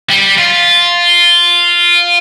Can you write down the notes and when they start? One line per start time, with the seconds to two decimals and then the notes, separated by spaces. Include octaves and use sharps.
0.10 G3
0.38 F4